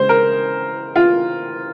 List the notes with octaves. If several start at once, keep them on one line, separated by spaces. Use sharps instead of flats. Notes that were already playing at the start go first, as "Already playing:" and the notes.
Already playing: C#3 G#3 C5
A#4
F4